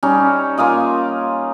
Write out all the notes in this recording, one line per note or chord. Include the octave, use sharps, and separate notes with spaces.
G3 C#4 D#4
A#3 F4 D#5 G#5